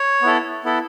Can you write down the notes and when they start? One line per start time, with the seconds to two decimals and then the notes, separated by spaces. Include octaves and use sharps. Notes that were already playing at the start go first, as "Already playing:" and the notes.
Already playing: C#5
0.22 B3 E4 A4
0.64 B3 E4 A4